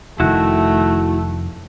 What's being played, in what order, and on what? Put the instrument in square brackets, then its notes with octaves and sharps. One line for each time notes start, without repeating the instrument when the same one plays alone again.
[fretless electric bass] F1 D#3 [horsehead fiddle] A3 [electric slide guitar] E4 F#4